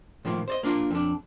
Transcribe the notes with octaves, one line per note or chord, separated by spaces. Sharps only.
A2 D#3 F3 A#3
C5 D5 D#5
A#3 D4 F4 A#4
F2 D4